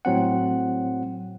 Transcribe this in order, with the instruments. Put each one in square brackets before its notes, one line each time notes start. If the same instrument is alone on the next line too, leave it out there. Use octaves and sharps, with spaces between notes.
[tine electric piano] A2 F#3 C4 F#5